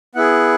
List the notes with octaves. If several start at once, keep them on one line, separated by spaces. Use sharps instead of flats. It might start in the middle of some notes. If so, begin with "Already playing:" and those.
B3 E4 G#4 F#5